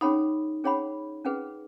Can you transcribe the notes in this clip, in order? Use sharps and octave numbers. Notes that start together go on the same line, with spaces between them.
C#4 D#4 G#4 C#5 F#5 B5
C#4 G#4 C#5 F#5 B5
C#4 G#4 B4 F#5